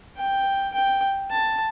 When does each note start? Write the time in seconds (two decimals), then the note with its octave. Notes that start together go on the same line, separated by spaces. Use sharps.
0.17 G5
0.74 G5
1.31 A5